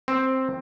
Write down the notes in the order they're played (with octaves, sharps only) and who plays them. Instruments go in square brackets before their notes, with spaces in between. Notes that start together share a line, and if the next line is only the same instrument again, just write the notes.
[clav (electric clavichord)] C4